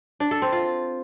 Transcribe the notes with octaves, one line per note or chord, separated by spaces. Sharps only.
D4
A4
C4
F4